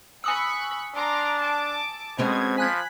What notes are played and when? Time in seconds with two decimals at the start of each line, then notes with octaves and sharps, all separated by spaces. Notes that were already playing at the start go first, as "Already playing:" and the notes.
0.24 G#5 B5 C#6 D#6 E6 F#6
0.95 D4 A#5 C6 D6
1.41 A5 D6
2.18 B2 G#3 C4 C#4 G#6
2.58 F3 G#5 B5 F#6 G#6 B6